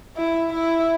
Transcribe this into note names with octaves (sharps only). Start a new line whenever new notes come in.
E4
E4